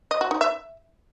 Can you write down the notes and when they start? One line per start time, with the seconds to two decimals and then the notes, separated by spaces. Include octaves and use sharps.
0.11 D#5
0.21 F#4
0.31 D#4
0.41 E5